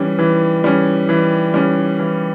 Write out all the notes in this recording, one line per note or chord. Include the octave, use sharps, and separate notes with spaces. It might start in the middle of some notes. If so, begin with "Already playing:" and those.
Already playing: E3 G3 C#4
E3
G3 C#4
E3
G3 C#4
E3